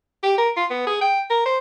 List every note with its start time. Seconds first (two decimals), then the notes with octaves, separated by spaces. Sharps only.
0.23 G4
0.38 A#4
0.57 F4
0.70 B3
0.87 G#4
1.01 G5
1.30 A#4
1.46 C5